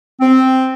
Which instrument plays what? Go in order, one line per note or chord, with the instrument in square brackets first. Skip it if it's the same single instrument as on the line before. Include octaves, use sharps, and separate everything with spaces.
[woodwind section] C4